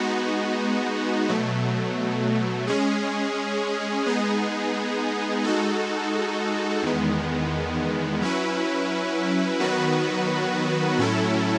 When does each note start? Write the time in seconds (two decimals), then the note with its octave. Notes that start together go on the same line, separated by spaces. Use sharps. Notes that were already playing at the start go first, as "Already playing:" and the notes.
Already playing: G#3 B3 D#4 F#4
1.29 B2 F#3 A3
2.67 G#3 C#4 G#4
4.06 G#3 B3 D#4 G#4
5.44 G#3 D#4 F#4 A4
6.83 E2 D#3 G#3 B3
8.21 F#3 C#4 E4 B4
9.60 D#3 F#3 B3 F#4 B4
10.98 A2 F#3 C#4 E4 A4